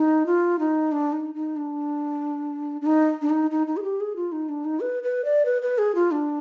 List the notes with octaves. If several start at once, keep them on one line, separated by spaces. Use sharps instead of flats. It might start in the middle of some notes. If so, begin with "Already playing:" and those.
Already playing: D#4
F4
D#4
D4
D#4
D#4
D4
D4
D#4
D4
D#4
D#4
D#4
G#4
G4
G#4
F4
D#4
D4
D#4
B4
B4
D5
B4
B4
G#4
F4
D4